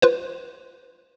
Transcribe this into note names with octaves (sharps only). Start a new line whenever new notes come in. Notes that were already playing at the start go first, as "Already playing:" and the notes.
F4 B4 C5